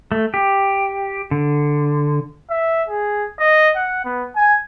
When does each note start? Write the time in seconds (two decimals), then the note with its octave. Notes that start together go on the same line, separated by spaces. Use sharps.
0.12 A3
0.34 G4
1.31 D3
2.50 E5
2.88 G#4
3.39 D#5
3.76 F#5
4.05 B3
4.36 G#5